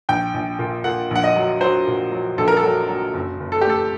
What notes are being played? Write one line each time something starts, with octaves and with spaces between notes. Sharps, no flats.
A#1 G5
A#1
A#2
A#2 F#5
A#1 F#5
D#5
F#3
F#3 C5
A#2
F#3
A#1 A4
A#4
A4
F#3
F#3
F#1
F#1
A4
G4
A3 A4